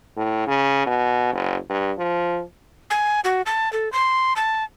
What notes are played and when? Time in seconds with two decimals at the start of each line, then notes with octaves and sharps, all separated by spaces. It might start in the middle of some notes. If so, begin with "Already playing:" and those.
0.16 A2
0.47 C#3
0.86 B2
1.33 F#1
1.69 G2
1.98 F3
2.90 G#5
3.24 F#4
3.46 A5
3.73 A4
3.92 C6
4.36 A5